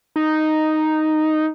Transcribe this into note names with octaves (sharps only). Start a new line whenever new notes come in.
D#4